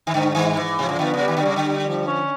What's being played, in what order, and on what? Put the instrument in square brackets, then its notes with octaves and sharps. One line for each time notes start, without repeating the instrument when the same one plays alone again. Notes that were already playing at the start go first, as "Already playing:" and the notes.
[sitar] D#3
[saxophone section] G#2 [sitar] D3
[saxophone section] G#2 [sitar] D#3
[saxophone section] G#2 [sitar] E3
[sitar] C3 [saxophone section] F3
[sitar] C#3
[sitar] D3 [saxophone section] B3
[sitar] C#3
[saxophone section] G3
[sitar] D#3
D3
[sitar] C#3 [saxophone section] G3
[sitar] D3
[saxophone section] G3
F3
C#4